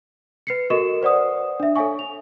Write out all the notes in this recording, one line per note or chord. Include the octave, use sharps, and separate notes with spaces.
B4 C7 C#7
F#4 A4 A#4 D#5 C#6 E7
B4 C5 D5 F#5 D#6
D4 E5
A4 C#5 E5 F5 G#5 C#6
F7